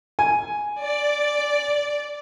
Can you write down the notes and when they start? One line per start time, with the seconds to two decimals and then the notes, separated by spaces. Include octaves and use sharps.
0.19 G#5
0.82 D5